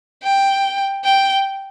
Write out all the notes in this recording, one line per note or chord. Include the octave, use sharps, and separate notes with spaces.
G5
G5